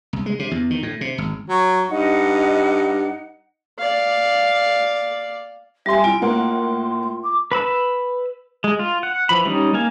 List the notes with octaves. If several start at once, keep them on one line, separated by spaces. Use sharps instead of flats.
C2
G#3
C3
E2
D#3
A2
C3
G#1
F#3 C#6
G2 D#4 F#5
D5 F5
G3 G4 E5 G#5 C6
E4 F4 D7
A2 A#3 F#5 C6
D6
B4 B5 E6
G#3
F4
F#5
E3 F3 B5
G3 C#4 D#4
A#3 F5 G#5